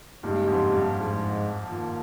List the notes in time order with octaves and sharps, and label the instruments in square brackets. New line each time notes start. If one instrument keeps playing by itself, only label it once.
[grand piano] G2 A#2 [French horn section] C#3 G#3 D#4 G4
[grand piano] F2 G#2
G2 A#2
[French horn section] G#2 F3 G#3
D#3 A#3 F4